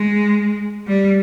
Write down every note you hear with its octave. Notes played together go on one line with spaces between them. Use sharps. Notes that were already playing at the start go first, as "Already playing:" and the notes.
Already playing: G#3
G3